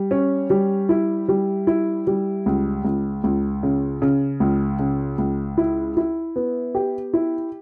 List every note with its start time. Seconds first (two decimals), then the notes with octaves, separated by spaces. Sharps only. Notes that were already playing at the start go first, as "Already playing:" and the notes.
Already playing: G3
0.11 C#4
0.50 G3
0.89 E4
1.28 G3
1.67 E4
2.07 G3
2.46 C#2
2.85 C#2
3.24 C#2
3.63 C#3
4.02 C#3
4.40 C#2
4.79 C#3
5.18 C#2
5.58 E4
5.97 E4
6.36 B3
6.75 G4
7.14 E4